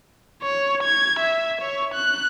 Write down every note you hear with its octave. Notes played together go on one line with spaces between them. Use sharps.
C#5
G#6
E5
C#5
F#6